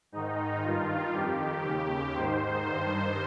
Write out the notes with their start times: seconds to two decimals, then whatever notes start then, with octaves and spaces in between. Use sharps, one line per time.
0.12 G#2 D#3 D#4
0.62 G2 D#3 F4
1.13 F2 D#3 G4
1.64 D#2 C#3
2.15 G#2 D#3 C5
2.65 G2 D#3 C5